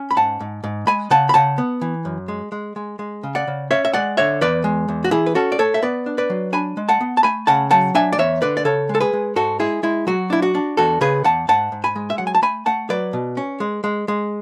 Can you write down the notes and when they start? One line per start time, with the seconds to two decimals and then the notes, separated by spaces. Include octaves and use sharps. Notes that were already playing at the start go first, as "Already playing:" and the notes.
Already playing: C#4
0.11 B5
0.16 G#2 F#5 A5
0.40 G#2
0.64 G#2
0.87 G#3 G#5 B5
1.10 C#3 F#5 A5
1.29 B5
1.34 C#3 F#5 A5
1.58 B3
1.81 E3
2.05 F#2
2.28 G#3
2.52 G#3
2.76 G#3
2.99 G#3
3.23 C#3
3.35 D5 F#5
3.47 C#3
3.71 C#4 C#5 E5
3.85 E5
3.94 G#3 D5 F#5
4.17 D3 C#5 E5
4.41 E2 B4 D5
4.64 G#3
4.88 E2
5.04 F#4
5.11 E3 E4 G#4
5.26 B4
5.35 C#4 F#4 A4
5.52 D5
5.59 A3 A4 C#5
5.74 E5
5.82 B3 B4 D5
6.06 D4
6.18 B4 D5
6.30 F#3
6.53 D4 G#5 B5
6.77 G#3
6.89 F#5 A5
7.01 B3
7.17 A5
7.23 A3 G#5 B5
7.47 C#3 F#5 A5
7.71 F#3 F#5 A5
7.95 D4 E5 G#5
8.13 D5
8.18 E2 C#5 E5
8.42 D3 B4 D5
8.57 D5
8.65 C#3 A4 C#5
8.89 G#3
8.95 A4
9.00 G#4 B4
9.13 G#3
9.36 G#2 F#4 A4
9.60 G#3 E4 G#4
9.83 G#3 E4
10.07 F#3 F#4
10.30 D4 E4
10.42 F#4
10.55 D4
10.77 E2 F#4 A4
11.01 C#3 G#4 B4
11.24 E2 F#5 A5
11.48 G#2 F#5 A5
11.72 G#2
11.84 G#5 B5
11.96 G#3
12.10 E5
12.18 F#3 F#5
12.27 G#5
12.35 A5
12.42 A3 G#5 B5
12.66 A3 F#5 A5
12.90 F#3 B4 D5
13.13 B2
13.37 C#4
13.60 G#3
13.84 G#3
14.08 G#3